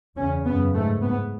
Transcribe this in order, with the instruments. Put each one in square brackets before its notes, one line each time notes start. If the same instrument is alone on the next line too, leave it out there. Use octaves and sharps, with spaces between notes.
[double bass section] E2 C#3 C#4
F#2 C#3 B3
G#2 A3
G#2 B3